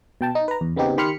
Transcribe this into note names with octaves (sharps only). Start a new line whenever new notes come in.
B2 G5 A5
D#4
B4 A#5
E2
C#3 B3 C4 D#4 G4
D#3 G4 B5 C6 F6 C#7